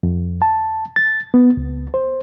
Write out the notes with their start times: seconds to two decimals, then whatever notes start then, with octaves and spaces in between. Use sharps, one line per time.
0.03 F2
0.42 A5
0.96 A6
1.34 B3
1.57 C#2
1.94 C5